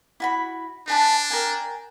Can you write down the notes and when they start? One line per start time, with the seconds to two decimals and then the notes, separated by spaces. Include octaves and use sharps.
0.20 E4 F#4 B5
0.88 D4 B4 G#5 A5
1.30 A#4 G5 G#5